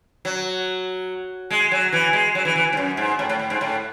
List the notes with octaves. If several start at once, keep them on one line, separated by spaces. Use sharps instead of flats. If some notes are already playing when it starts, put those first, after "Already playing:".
F#3
G#3
F#3
E3
G#3
F#3
E3
E3
G#2
F#2
G#2
A2
A2
A2
G#2
A2